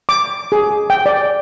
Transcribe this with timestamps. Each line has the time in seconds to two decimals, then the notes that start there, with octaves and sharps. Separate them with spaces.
0.09 D6
0.52 G#4
0.90 G5
1.06 D5